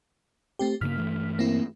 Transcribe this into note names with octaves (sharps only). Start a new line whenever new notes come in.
A3 C4 G4
G2 C#3 A#3 F6 B6
G2 E3 A3
A#3 C4 E4